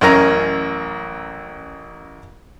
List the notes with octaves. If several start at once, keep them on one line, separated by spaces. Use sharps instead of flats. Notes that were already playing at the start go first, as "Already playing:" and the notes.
A1 F#2 C#4 A#4 A#5